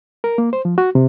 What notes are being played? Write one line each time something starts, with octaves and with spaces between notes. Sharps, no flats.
A#4
A#3
C5
F3
F#4
C3